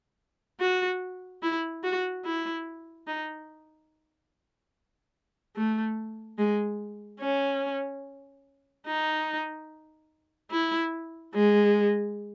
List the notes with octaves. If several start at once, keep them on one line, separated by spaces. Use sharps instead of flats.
F#4
E4
F#4
E4
D#4
A3
G#3
C#4
D#4
E4
G#3